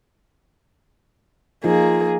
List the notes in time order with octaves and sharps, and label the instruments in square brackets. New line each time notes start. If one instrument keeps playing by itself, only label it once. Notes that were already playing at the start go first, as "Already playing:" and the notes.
[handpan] F3 D#4 F4 [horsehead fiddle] A#3 G#4